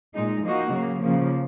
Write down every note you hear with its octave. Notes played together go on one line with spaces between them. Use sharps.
A#2 G#3 D#4
F3 A#3 D#4 F#4
C#3 F#3 A#3
C#3 F3 A#3